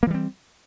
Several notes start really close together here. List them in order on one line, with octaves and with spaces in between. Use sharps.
A#3 E3 G3 C4